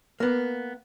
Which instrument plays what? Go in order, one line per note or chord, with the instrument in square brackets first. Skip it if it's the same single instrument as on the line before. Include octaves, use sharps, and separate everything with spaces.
[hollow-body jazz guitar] A#3 B3